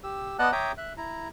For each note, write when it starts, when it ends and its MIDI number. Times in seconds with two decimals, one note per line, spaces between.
0.04 0.37 67
0.04 0.37 88
0.39 0.51 59
0.39 0.51 74
0.39 0.51 75
0.39 0.51 78
0.39 0.51 81
0.39 0.51 90
0.52 0.72 73
0.52 0.72 76
0.52 0.72 79
0.52 0.72 82
0.52 0.72 86
0.52 0.72 87
0.78 0.93 76
0.78 0.93 90
0.97 1.28 64
0.97 1.28 82